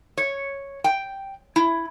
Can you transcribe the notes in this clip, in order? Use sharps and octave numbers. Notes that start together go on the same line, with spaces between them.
C#5
G5
E4